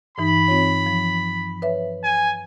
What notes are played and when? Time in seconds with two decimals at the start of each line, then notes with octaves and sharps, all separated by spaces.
0.18 G2 E3 D#4 B5
0.48 C4 F4 C#5
0.86 F3
1.62 B4 C#5 E5
2.04 G#5